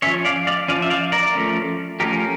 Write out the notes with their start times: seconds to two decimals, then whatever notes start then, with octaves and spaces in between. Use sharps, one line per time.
0.02 F3 C#4 C#5 E5
0.25 D5 F5
0.47 D5 F5
0.68 F3 C#4 D5 F5
0.82 E5
0.90 D5 F5
1.12 A#4 D5
1.35 F3 A3 C#4
2.00 F3 A3 C#4 G4 A#4